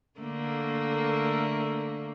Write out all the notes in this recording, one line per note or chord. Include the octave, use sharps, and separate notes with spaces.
D3 A3 A#3